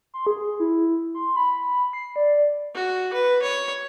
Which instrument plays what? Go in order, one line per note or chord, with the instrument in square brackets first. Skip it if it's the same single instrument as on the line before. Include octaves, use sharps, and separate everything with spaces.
[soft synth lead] C6
G#4
E4
C6
B5
C7
D5
[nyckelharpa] F#4
B4
C#5